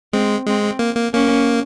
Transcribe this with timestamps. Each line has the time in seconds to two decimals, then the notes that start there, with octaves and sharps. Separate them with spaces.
0.13 G#3 C4
0.47 G#3 C4
0.79 A#3
0.96 A#3
1.13 A#3 C#4